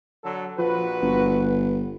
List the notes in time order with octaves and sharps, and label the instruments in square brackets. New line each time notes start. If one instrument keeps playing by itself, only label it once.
[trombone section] D3 F#3 A4
[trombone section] A#1 F#4 B4 [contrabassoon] F3
[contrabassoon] G1